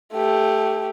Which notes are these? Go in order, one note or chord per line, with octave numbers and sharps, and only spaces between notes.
A3 G4